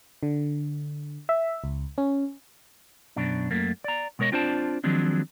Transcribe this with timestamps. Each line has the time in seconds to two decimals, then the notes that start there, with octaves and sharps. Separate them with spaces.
0.23 D3
1.29 E5
1.64 C#2
1.98 C#4
3.16 F#2 B2 D4
3.51 F#2 A3 A#3
3.84 D5 A#5
4.19 B2 G#3 A#4 C#5 D#5
4.32 C4 D4 F4 C5 D5 A5
4.84 D#3 F3 F#3 G#3 C4 D4